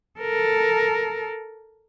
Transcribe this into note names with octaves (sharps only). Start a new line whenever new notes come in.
A4 A#4